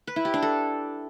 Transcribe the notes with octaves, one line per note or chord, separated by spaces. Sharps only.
B4
E4
G4
D4
A4